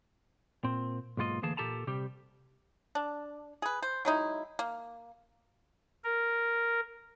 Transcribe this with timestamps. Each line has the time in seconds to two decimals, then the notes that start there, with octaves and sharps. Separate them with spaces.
0.64 A#2 C4
1.17 B1 G#2 A#3 F4 D#5
1.42 D2 E3 A#3 G#4 A5
1.57 A#2 G4 A4 A5 A#5
1.87 C3 G3 G4
2.95 D4
3.62 G#4 B4
3.82 C5
4.05 F#3 G#3 D#4 E4
4.59 A#3
6.04 A#4